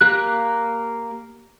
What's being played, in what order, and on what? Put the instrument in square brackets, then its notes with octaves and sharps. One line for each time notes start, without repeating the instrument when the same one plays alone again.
[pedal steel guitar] A#3 G4 F#6